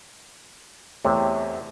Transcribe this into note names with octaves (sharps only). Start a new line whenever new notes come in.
E2 C3 A3 C#5